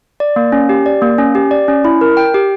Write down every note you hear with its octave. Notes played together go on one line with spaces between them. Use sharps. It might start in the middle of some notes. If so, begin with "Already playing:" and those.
D5
A#3
C#4
G4
D5
A#3
C#4
G4
D5
C#4
E4
A#4
G5
G4